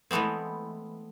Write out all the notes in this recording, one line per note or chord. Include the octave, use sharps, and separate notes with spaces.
E3 G#3 A3 B3 C4